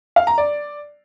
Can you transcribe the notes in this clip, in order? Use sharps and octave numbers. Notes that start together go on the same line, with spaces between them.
F5
A#5
D5